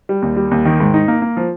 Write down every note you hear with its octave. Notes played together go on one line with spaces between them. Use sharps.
G3
D#2
G3
D#2
D#3
G#2
D#4
A#3
A#3
F3